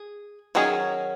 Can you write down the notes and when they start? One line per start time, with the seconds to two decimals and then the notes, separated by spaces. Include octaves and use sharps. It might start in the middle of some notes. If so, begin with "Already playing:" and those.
Already playing: G#4
0.55 D#3 F#3 C#4 G#4